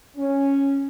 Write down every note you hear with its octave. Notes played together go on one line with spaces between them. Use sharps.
C#4